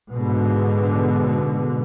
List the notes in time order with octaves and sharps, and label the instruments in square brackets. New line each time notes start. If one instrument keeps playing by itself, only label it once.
[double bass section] G#2 B2 D3